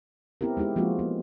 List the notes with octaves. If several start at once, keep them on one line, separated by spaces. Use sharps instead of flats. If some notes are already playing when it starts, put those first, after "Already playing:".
B3 C4 E4 G4 A#4
G#3 D#4 E4 G4
F3 G#3 A#3 C4 F4 F#4
B3